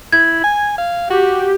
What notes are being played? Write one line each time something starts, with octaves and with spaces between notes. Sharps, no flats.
E4 G#6
G#5
F5
F#4 G4